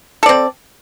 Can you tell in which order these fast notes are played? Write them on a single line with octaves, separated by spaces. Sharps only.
A4 D5 C4